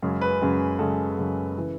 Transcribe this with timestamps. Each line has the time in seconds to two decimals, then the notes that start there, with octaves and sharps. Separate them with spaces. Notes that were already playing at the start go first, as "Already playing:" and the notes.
0.02 F#2 C#3 G#3
0.21 B4
0.41 F#2 C#3 G#3
0.79 F#2 C#3 G#3 A4
1.17 F#2 C#3 G#3
1.57 C#3 E3